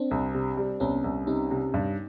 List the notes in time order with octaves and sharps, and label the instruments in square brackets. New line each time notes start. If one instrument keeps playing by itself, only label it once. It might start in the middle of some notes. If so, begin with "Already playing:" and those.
Already playing: [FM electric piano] C4 D4
[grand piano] C2
C3
G3
[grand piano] C2 [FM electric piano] B3 C#4
[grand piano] C2
[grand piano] C3 [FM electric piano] C#4 D#4
[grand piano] C3
G2